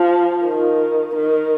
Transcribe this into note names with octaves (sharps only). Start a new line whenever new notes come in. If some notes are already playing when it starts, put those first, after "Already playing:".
Already playing: F3
D#3
D#3